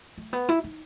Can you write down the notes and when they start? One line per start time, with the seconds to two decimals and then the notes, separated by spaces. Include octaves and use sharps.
0.18 A3
0.33 B3
0.49 E4
0.64 D#4